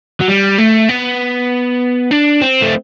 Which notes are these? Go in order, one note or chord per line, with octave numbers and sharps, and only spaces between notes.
F#3
G3
A3
B3
D4
C4
A3